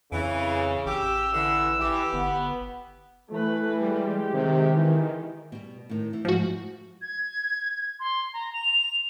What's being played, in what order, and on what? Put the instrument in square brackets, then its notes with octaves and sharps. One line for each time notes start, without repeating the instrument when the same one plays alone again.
[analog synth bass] F2 [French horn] C#3 [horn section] E3
[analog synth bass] A1 [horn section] G4 [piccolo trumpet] E6
[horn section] D3 [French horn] E3
[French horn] E3 [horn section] G4
[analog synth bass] G1 [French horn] B3
[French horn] E3 [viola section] A3 B4
[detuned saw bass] G3 [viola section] G#3 G4
[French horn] C3 [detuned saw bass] D#3
[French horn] E3
[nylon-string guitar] B2 G3
A2 D#3
E3
[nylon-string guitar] G#2 A3 [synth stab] F3 F#4
[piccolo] G#6
C6
A#5
F7